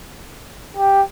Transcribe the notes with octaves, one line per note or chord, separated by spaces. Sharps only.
G4